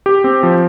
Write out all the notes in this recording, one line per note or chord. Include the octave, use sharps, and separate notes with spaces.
G4
C4
F3